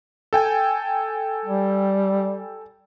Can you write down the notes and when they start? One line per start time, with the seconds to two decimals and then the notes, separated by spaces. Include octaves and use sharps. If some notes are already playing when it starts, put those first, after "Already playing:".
0.33 A4 G5 G#5
1.45 G3